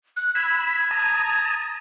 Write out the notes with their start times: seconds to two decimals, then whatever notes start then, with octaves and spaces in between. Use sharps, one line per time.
0.16 F#6
0.35 B5 E6 G#6
0.91 A5 A#5 D#6